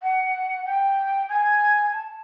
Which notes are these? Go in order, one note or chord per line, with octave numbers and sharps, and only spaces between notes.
F#5
G5
G#5
A5